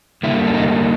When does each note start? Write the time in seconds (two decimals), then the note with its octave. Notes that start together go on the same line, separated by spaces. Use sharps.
0.23 D3 G3 A#3 E4
0.47 D4
0.54 D#4